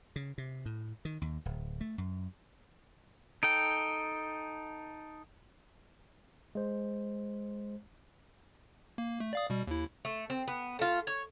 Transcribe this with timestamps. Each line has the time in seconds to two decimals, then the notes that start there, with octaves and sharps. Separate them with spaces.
0.16 C#3
0.38 C3
0.66 A2
1.05 D#3
1.22 D#2
1.45 D1
1.81 A3
1.98 F#2
3.43 D#4 A4 G5 D7
6.55 G#3 C5
8.98 A#3
9.20 A3
9.33 D5 F5 D#6
9.50 B2 G3
9.67 D#2 E4
10.05 A3
10.30 C4
10.48 B3
10.79 A3 F4
11.07 C#5